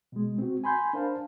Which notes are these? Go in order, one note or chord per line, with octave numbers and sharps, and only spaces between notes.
B2 G#3
C4 F#4
G#5 B5 C6 G6
D4 A#4 C5 F5 A5